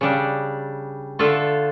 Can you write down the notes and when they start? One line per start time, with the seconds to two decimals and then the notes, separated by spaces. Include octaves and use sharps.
0.01 C#3 G3 D4
1.19 D3 A3 D4 F4 A4